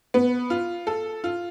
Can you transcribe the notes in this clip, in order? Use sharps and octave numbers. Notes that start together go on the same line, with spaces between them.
B3
F4
A4
F4